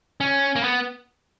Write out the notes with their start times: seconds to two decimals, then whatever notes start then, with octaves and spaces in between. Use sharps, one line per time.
0.21 C#4
0.56 A#3
0.64 B3